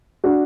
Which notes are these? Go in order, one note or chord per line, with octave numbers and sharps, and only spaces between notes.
D4 F#4